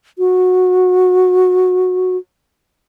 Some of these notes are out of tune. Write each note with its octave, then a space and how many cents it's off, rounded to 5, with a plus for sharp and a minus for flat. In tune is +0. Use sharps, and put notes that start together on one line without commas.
F#4 -15